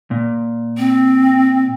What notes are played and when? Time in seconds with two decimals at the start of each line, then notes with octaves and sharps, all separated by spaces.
0.11 A#2
0.78 C4